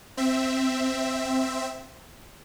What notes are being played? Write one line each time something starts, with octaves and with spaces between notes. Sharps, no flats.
C4 E5